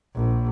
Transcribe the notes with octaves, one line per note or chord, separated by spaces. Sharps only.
A#1